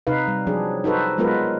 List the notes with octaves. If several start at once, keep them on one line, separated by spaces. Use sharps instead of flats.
C3 D#4 B4 F5
G3
F3 F#3 D4 G#4
D#4 F#4 A4 B4 C5
F#3 G#3 B3 F4 A#4 B4